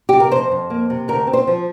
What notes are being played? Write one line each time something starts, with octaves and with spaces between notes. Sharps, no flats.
C3 G4
A#4
F2 C5
F2
A#3
C3
D2 A#4
C4
C5
F3